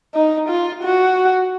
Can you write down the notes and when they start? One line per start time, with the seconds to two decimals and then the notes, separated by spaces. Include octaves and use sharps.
0.15 D#4
0.49 F4
0.83 F#4